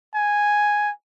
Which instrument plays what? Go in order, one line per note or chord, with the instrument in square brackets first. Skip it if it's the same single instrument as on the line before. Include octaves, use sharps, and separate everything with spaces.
[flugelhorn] G#5